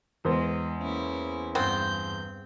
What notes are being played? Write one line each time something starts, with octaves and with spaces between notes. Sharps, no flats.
E2 G#3 C5
A#3 C#4 E4
G2 C#3 B3 C4 G6